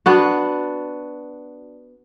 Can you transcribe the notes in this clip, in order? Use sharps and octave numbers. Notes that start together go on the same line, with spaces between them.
B3 D4 F#4